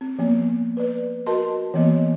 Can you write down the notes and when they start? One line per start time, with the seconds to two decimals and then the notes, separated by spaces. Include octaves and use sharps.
0.01 C4
0.19 F3 A#3 B3
0.77 B4 D5
1.27 F#4 A#4 D#5 A5 C6
1.74 E3 A#3 B3 D#5